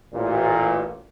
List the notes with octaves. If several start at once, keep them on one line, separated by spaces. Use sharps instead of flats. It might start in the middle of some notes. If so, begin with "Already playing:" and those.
A1 A#2